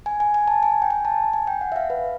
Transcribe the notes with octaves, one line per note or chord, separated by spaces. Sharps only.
G#5
G#5
G#5
A5
G#5
G5
G#5
A5
G#5
G5
F#5
E5
F5
B4